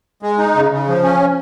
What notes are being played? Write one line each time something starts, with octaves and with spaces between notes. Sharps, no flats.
G#3
D#4
C#3
C#3
F3
C#4